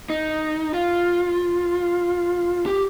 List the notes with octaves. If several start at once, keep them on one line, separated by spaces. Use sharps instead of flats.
D#4
F4
G4